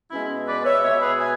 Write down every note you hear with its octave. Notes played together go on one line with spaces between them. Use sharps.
B2 G#3 B3 C#4 E4
B4 D5
C#5 E5
B2 G#3 B3 C#5 E5
G#4 B4
E5 G#5